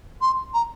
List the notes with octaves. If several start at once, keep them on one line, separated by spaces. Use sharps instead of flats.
C6
A#5